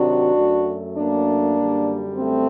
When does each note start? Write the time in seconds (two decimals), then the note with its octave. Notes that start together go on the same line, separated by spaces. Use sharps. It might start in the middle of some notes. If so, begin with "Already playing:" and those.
Already playing: C3 D#3 F#3 D4 F#4
0.35 F#2 F#3 A3
0.96 A#3 D4
1.57 F#2 D3 G3
2.17 A3 C4